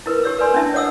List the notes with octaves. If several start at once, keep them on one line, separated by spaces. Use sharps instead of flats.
E4 A#4 B4
G4 C#5 E6
A#4 B4 D5 G#5 C6
C#4 D4 E4 E5 A5
C#5 D#5 F#5 D#6 E6